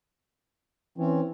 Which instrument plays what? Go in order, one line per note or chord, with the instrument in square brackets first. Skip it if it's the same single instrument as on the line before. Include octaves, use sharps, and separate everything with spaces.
[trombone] E3 [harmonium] C4 C#4